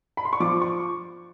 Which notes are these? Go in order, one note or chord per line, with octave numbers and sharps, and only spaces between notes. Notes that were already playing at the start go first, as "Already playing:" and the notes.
B5
C6
C#6
F3 D6
C#6